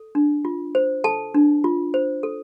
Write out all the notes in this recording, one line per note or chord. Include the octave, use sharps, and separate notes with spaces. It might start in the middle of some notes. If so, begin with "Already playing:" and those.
Already playing: A4
D4
F4
C5
A4 A5
D4
F4
C5
A4